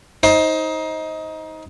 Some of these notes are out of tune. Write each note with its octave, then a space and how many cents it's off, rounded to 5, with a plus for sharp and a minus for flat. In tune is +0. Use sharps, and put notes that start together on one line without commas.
D#4 +20 C5 +20